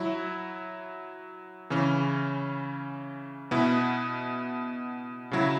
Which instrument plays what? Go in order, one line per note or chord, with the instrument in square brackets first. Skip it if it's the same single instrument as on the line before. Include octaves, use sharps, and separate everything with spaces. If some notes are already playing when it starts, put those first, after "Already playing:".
Already playing: [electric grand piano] F#3 E4
C#3 E3 C#4
B2 B3 E4
C#3 F#3 E4